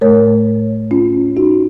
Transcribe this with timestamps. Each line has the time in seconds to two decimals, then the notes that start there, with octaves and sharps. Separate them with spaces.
0.01 A2 A3 A#4 C#5
0.91 C#4 F4
1.36 D#4 F#4